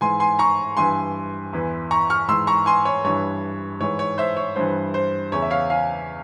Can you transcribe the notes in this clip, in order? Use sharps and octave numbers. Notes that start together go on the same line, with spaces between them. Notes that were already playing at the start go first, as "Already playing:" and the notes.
G#2 E3 G#5 C6
G#5 C6
A#5 C#6
G2 E3 G#5 C6
E2 E3
A#5 C#6
C#6 F6
G#2 E3 C6 E6
A#5 C#6
G#5 C6
C#5
G2 E3 C#5
G#2 E3 C#5
C#5
C5 E5
C#5
G2 E3 C5
C5
E2 C#3 E3 C#5
E5
C#5 F5
F5 G#5